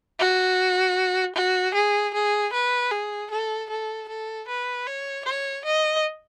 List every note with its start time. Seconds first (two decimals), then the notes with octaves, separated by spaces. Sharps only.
0.19 F#4
1.36 F#4
1.74 G#4
2.14 G#4
2.53 B4
2.91 G#4
3.31 A4
3.70 A4
4.08 A4
4.48 B4
4.87 C#5
5.25 C#5
5.65 D#5